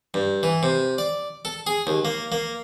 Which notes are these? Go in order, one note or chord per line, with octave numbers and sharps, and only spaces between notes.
G2
E3
C3
D5
A4
G#4
D#2
A#3
A#3